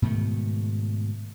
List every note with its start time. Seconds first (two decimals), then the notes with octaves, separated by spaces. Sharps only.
0.02 G#2 B2 D#3 A3